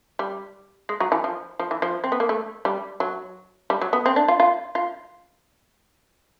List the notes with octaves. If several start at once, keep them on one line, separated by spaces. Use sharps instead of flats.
G3
G#3
F#3
E3
F3
F3
E3
F3
C4
B3
A#3
A3
G3
F#3
G3
F#3
B3
C4
D4
F4
F4
F4